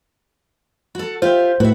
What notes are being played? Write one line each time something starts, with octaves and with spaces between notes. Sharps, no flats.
F#4 A4
F4 G4 C5 E5
A2 F#4 B4 E5